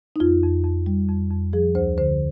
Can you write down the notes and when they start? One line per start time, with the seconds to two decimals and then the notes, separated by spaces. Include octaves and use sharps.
0.16 D#4
0.20 F2 F4
0.43 F2
0.64 F2
0.86 G3
1.09 F2
1.31 F2
1.53 F3 G#4
1.75 D2 C5
1.98 D3 C5